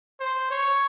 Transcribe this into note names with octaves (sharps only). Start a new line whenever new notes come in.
C5
C#5